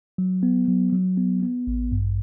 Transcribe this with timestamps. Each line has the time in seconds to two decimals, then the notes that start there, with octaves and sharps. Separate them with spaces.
0.18 F#3
0.43 B3
0.68 F#3
0.92 F#3
1.17 B3
1.43 B3
1.67 A1
1.92 G2